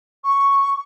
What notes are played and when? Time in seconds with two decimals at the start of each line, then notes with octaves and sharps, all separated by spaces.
0.24 C#6